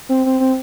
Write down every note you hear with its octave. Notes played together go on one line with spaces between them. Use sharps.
C4
C4
C4